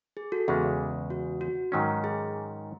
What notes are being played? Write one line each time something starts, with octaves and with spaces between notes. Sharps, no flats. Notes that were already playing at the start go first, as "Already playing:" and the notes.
G#4
F#4 A4
E2 C#3 G#3 G#4
F#4
F#4
G#2 D#3 F#3 C#4
G#4